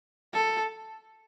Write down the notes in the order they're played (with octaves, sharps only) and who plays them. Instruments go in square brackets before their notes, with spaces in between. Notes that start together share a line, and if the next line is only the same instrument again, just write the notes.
[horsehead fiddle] A4